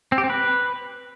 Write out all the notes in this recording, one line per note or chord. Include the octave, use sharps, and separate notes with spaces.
C4
G4
C4
B4